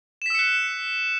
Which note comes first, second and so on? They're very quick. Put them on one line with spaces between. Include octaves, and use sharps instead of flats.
E7 B6 E6 C#7 F#6